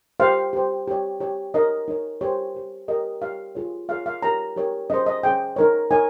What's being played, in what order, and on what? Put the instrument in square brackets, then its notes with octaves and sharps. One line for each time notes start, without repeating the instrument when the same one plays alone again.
[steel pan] G4 C5 F5
G4 C5
G4 C#5
G4 C#5
D#4 A#4 C#5 D#5
D#4 A#4 C#5
G4 C5 C#5
G4 C5
G4 A#4 C#5 D#5
G4 A#4 C#5 F5
F4 G#4 C#5
F4 G#4 C#5 F5
F5
D#4 G4 A#4 C#5 A#5
D#4 G4 A#4 C#5
C#4 G#4 C5 D#5
D#5
C#4 G#4 C5 G5
D#4 A#4 C#5
D#4 A#4 C#5 G#5